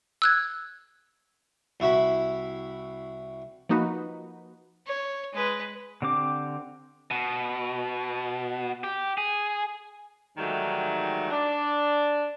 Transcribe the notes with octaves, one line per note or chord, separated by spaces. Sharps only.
E6 F#6 G#6
C2 E4 F#4 E5 B5
F3 A#3 D#4 F#4 B4
C#5
G#3 B4
D3 C4 G4 D6
B2
G4
G#4
G#2 D#3 E3 F#3 G3 A3
D4 D5